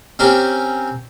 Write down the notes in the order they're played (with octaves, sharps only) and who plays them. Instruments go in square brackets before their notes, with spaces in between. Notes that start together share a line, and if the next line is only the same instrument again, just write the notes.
[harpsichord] C4 C#4 G4 A#4